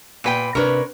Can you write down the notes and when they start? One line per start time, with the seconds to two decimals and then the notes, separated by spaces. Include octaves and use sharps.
0.24 A#2 B4 G5
0.55 C3 D4 A#4 B4 C#5